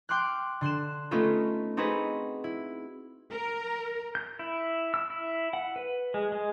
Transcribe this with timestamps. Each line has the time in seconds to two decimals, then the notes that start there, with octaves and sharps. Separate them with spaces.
0.09 G5 C6 D6 F6 F#6
0.61 D3 C6 F#6 E7
1.11 A3 B3 C#4 D#4 F4 A4
1.77 C4 D#4 F#4 G#4 B4
2.44 E4
3.31 A#4
4.15 G6
4.39 E4
4.94 E6
5.10 E4
5.53 F#5
5.76 B4
6.14 G#3
6.32 G#3